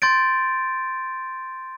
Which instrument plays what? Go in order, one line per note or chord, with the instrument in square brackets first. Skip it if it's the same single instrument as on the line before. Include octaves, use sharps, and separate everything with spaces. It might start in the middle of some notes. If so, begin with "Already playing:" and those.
[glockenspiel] C6 G6 A6 D7